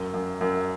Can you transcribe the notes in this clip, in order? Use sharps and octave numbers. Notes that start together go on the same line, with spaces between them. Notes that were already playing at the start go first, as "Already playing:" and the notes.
Already playing: F#2
F#2
F#2